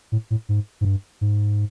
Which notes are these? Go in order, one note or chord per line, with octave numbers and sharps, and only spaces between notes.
A2
A2
G#2
G#2
G2
G#2